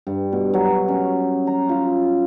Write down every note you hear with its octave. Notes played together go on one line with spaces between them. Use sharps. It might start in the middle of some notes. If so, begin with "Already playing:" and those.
G2
B2
F#3
C#4
A#5
F4